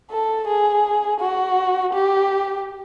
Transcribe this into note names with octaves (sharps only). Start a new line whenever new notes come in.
A4
G#4
F#4
G4